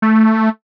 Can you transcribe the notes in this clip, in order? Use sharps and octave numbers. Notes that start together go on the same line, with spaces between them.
A3